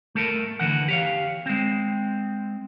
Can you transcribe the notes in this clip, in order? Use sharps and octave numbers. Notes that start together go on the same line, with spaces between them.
A3 A4 A#4
D3 E3 F#5
G4 C#5 F5
G#3 C4